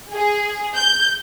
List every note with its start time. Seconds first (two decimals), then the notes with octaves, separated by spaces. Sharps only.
0.13 G#4
0.76 G6